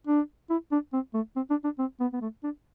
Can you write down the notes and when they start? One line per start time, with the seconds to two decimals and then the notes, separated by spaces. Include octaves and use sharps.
0.07 D4
0.50 E4
0.72 D4
0.93 C4
1.14 A3
1.36 C4
1.50 D4
1.64 D4
1.79 C4
2.00 B3
2.13 B3
2.21 A3
2.43 D4